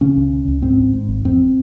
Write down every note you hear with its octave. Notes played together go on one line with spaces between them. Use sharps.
C#3 C#4
C#2
C#3
C#2
G#2 C4
G#1
G#2
G#1
F2 C4